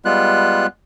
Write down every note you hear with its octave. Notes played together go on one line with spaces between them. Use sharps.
G3 G#3 B3 F4 F#6